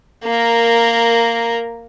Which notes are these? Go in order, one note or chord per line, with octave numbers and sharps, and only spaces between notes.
A#3 A#4